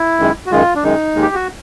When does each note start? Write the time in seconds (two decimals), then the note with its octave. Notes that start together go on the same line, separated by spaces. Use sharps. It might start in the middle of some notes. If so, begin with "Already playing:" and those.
Already playing: E4
0.20 F#2 D#3 G#3
0.46 F#4
0.51 F#2 D#3 G#3 F4
0.75 D4
0.84 F#2 D#3 G#3 D#4
1.16 D#2 D#3 G#3
1.22 G4
1.35 F#4